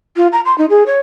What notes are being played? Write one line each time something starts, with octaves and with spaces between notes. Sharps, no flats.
F4
A#5
C6
D#4
G#4
C#5